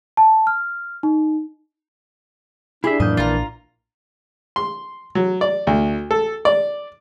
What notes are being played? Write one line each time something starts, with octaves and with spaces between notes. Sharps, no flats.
A5
F6
D#4
D4 E4 G4 G#4 E5
F2 A2 E3 F#3 A#3 D#5 G6
A#1 A#2 F4 A#5
C6
F#3
D5
D2
A4
D5